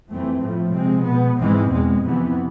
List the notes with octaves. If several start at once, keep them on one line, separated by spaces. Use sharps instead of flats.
F2 E3 A3 C4
A2 F3 A3
C3 G#3 C4
B2 B3
G#2 E3 G#3 C4
E2 B2 G#3
F2 C3 E3 B3